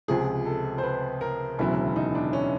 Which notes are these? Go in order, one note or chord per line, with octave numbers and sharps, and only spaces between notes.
C#2 C3 F3 G#4
A4
C5
B4
A#4
E1 D2 C#3 F#3 E4
D#4
D4
C#4